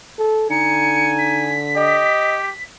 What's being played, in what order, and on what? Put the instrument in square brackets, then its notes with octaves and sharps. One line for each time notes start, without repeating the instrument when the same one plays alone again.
[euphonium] A4
[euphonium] D3 [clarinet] D#4 [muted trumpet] G#5 [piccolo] C#7
[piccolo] B6
[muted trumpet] G4 [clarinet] D#5